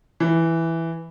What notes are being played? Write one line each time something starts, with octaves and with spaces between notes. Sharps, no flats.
E3